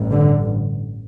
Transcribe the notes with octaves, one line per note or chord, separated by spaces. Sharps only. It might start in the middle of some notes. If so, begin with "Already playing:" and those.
Already playing: A1 G2
D3